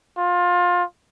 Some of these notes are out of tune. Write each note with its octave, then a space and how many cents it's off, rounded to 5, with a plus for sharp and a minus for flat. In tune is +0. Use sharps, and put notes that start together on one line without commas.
F4 +20